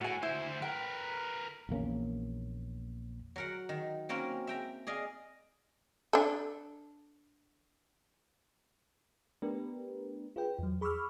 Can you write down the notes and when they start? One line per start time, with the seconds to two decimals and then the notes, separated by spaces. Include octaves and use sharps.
0.01 A2 F#4 G#5
0.23 D2 E4 C5
0.62 A#4 B4 G5
1.69 A#1 E2 A#3 C#4
3.36 F#3 A#4 F#5
3.69 D#3
4.09 F#3 A#3 C4 C#4 A#4
4.47 E5 G5 A#5
4.87 G#4 D5 D#5 F5
6.13 D4 A4
9.42 A3 B3 D4 G4 A#4 B4
10.36 F4 G#4 B4 G5
10.59 E2 F#3
10.81 G#4 B5 C#6 D6 E6 F6